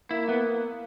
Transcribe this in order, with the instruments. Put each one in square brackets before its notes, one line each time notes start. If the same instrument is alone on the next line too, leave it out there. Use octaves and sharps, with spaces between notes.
[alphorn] A#3 [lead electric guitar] E4
[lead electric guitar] B3